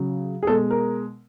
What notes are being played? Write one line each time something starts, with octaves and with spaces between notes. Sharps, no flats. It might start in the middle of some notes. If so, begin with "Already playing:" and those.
Already playing: C#3 F#3
G#4
B2 G#3 A4
A#4